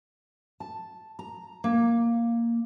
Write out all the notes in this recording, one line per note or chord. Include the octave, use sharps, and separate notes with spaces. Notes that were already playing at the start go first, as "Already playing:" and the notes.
A5
A#5
A#3